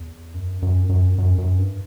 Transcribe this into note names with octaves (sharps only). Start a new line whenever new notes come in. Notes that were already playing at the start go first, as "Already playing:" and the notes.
Already playing: E2
F#2
F#2
F#2
F#2
F#2
G2